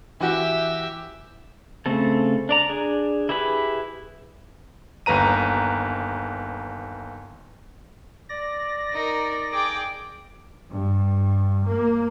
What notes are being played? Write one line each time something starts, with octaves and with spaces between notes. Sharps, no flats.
E3 F#4 G4 E5
C#3 A3 C4 A4
D4 D5 A#5
D4 G#4
E4 G4 G#4 B4 B5
G1 D#2 B4 A#5 D#7
D5 A#6
D#4 A#4
G#4 G5 D6
G2
A#3